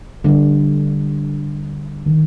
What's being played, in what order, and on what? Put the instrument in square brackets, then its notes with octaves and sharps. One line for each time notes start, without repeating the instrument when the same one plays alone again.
[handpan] D3 G3 D4
[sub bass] D#3